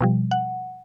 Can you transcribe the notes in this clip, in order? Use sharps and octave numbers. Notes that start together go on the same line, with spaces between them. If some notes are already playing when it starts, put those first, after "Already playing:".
B2 F3 G3
F#5